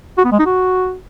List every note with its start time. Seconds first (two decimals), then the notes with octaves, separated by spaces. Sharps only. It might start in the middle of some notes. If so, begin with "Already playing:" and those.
0.18 F#4
0.25 B3
0.32 G#3
0.39 D#4
0.46 F#4